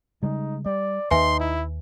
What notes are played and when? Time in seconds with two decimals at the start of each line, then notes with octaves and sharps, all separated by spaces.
0.23 C#3 G3 G#3 D#4
0.66 G3 D5
1.11 D#2 D#3 D#4 B4 E5 G#5 C6
1.40 E4